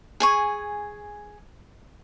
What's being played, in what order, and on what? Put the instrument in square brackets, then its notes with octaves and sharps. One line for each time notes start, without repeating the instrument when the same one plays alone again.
[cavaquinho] G#4 G#5 C#6